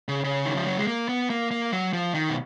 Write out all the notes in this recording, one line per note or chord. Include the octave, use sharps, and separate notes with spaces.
C#3
C#3
D#3
F3
F#3
G#3
A#3
B3
A#3
A#3
F#3
F3
D#3
B2